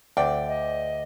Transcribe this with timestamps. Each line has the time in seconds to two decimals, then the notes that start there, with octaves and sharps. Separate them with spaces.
0.17 D2 D5 G5
0.48 D#5